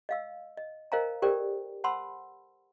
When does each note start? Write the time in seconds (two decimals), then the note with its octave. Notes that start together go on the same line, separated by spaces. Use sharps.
0.09 D#5 F5 E6
0.57 D#5
0.92 A#4 C5 D#5 F5 G#5 A#5
1.22 G4 A4 A#4 C5 D5 G5
1.84 C5 F#5 A5 B5 C6 E6